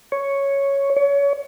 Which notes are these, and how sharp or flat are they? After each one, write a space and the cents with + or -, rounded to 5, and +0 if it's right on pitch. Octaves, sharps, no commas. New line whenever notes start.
C#5 +0
C#5 +30